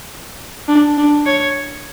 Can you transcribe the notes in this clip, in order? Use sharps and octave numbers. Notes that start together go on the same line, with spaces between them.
D4
D4
C#5